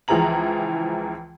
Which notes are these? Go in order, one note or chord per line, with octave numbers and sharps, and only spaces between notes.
C#2 E3 F3 G#4 A#5 F#7